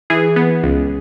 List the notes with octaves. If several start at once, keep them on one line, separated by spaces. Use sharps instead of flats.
E3 G#4
B3
C#2